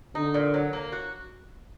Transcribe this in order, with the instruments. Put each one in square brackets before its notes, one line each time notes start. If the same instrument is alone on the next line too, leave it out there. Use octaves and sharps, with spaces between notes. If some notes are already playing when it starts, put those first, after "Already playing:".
[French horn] D3 [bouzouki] D#4
[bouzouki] A#2
F#3
A#3
F#4